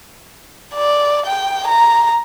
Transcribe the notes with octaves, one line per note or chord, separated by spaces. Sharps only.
D5
G5
A#5